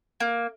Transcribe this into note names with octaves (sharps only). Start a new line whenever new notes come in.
A#3